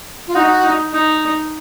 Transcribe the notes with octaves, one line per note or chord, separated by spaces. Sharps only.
F4
D#4 F#4
D#4
D#4